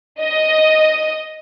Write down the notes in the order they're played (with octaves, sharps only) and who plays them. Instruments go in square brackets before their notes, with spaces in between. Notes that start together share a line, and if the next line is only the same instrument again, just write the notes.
[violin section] D#5